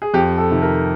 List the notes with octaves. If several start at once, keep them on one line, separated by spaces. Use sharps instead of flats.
G#4
F2 G4
A4
C3 D#3
A#4